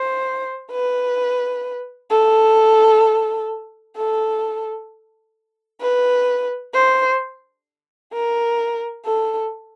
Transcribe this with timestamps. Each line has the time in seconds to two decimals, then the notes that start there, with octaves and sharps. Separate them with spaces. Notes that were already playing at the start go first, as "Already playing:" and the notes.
Already playing: C5
0.72 B4
2.11 A4
3.96 A4
5.81 B4
6.74 C5
8.14 A#4
9.05 A4